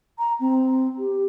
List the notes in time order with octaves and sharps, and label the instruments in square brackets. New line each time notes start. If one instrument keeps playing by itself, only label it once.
[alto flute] A#5
C4
G4